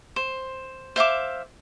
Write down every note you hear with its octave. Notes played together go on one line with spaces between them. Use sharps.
C5
C5 E5 F5 D6